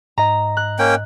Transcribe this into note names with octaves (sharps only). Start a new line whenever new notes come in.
G#2 D#5 A#5
F#6
A#3 C#4 G5